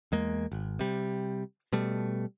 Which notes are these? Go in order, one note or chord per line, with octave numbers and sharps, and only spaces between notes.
E2 G#3 A#3
G#1
C3 G3
B2 G3 A3